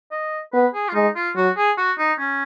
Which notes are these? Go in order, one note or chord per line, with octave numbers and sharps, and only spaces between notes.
D#5
B3 B4
G#4
F4
G#3 D#4
F4
F#3 F#4
G#4
F#4
D#4
C#4